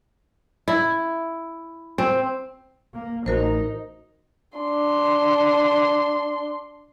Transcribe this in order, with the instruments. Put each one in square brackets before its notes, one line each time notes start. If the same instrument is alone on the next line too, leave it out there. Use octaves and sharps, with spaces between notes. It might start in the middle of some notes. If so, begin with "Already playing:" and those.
[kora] E4
C4
[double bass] A#3
[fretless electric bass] A1 [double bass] D#4 [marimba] F#4 A#4 C5
[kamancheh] D4 C6